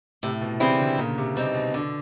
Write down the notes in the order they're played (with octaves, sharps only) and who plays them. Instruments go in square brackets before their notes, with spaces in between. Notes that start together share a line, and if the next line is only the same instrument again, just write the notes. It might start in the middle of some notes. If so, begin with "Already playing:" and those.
[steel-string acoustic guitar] A2 [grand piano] C3
[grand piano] B2
[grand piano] C#3 [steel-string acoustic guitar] E3 G3 C4 E4
[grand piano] D3
[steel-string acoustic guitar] A#2 [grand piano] C#3
[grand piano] C3
[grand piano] B2 [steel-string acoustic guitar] G3 C4 D#4
[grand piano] B2
[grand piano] B2 [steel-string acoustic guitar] D3